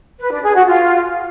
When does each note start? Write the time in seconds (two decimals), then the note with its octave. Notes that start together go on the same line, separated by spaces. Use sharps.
0.19 B4
0.31 D4
0.43 G#4
0.55 F#4
0.67 F4